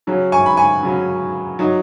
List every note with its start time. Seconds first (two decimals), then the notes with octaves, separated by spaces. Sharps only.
0.07 C#3 F#3 C#4
0.32 G#5 C#6
0.46 B5
0.57 G#5 C#6
0.83 C#3 F#3 C#4
1.59 F#3 D#4